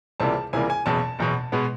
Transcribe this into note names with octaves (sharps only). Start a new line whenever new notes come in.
C#2 C3 E3 G3 A#3 A5
C#2 C3 E3 G3 A#3 G#5
G#5
F#1 E2 B2 A5
F#1 E2 B2
B2 G#3 B3